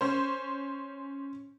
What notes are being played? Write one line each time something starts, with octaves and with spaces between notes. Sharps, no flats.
C#4 C5